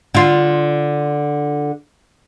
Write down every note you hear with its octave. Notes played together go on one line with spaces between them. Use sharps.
D3 F4